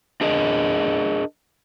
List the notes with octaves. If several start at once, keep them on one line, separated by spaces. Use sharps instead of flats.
D4 G#4 A#4 D#5